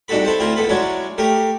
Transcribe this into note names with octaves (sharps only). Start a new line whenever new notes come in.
C2 D4 D#4 F#4 A4 B5
E4 A4 C5
D2 C4 E4 F4 A#5
C#2 B3 A4 B5
F#3 G#3 C#4 D4 E4
A3 G4 A#4